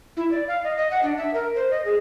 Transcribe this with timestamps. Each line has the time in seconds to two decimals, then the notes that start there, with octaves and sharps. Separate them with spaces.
0.17 E4
0.31 D5
0.48 F5
0.64 D#5
0.77 D#5
0.91 F#5
1.03 D4
1.18 E5
1.34 A#4
1.56 C5
1.71 D#5
1.85 G#4